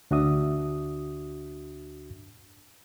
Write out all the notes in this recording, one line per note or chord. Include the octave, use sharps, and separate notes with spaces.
D2 D4 F#4 E5 D#6